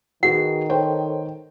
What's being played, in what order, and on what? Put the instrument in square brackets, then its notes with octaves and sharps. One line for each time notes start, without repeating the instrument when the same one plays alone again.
[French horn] D#3 [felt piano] F#4 G#4 B4 [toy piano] F#5
[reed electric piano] A4 C5 C#5 [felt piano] G5